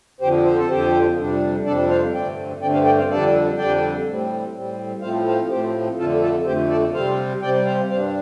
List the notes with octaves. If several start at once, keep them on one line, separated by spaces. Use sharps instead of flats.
F2 D3 F3 G4 C5
C5
A4
F2 D3 F3 G4 C5
F2 C3 G3 D4
F2 C3 G3 D4 A4 D5
C5 F5
G2 D3 A3 C4 D5 G5
G2 D3 A3 C4 D5 G5
C5 F5
D5 G5
C5 F5
F2 D3 G3 D4 A4 D5
F2 D3 G3 D4 D5 G5
A2 G3 C4
A2 G3 C4
A2 F3 A3 C4 C5 F5
C5 F5
A2 F3 A3 C4 G4 C5
F2 D3 A3 F4 A4
F4 A4
F2 D3 A3 G4 C5
A4 D5
C3 G3 C4 C5 F5
C3 G3 C4 D5 G5
C5 F5
G2 G3 D4 C5 F5